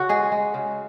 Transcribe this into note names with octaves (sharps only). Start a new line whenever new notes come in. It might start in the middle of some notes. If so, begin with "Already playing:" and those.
Already playing: C#3 F#4
G#3 G#4
G#3
C#3